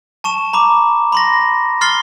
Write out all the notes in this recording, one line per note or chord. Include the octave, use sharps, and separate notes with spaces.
A5 C#6 E7
A#5 B5 D6
B5 C6 A#6
C6 F6 A6 C7 G7